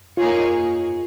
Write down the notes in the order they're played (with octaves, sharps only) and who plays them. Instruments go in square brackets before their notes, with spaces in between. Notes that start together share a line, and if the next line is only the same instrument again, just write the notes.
[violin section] A#3 D#4 G#4 C#5 [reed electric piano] F4